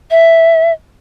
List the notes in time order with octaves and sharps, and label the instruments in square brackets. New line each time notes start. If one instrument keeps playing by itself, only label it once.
[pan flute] E5